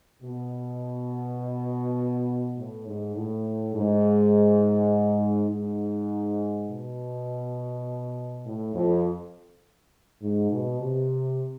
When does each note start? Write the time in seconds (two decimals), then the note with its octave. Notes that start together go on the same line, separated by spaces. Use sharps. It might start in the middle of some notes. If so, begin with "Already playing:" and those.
0.23 B2
2.57 A2
2.87 G#2
3.16 A2
3.75 G#2
5.51 G#2
6.70 B2
8.46 A2
8.75 F2
10.22 G#2
10.52 B2
10.81 C3